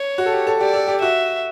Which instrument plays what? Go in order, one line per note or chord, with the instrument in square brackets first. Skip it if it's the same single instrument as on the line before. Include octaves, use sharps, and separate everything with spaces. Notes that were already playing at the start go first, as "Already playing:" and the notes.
Already playing: [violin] C#5
[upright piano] F#4
A4
G4
A4
[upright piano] G4 [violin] D5
[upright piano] A4
G4
[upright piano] F#4 [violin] E5